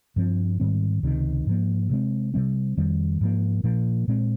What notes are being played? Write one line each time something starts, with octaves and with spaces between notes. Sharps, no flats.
G2 F3 C4
G#2 D#3 G3 C4
C#2 C3 D#3
G#2 F3 A#3
C3 F3 G#3 C4
C3 G3 C4
F2 D#3 G3
G#2 F3 A#3
A#2 F3 A#3
A#2 G#3 C4